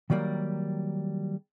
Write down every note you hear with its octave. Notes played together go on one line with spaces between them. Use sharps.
D#3 F#3 G3 A#3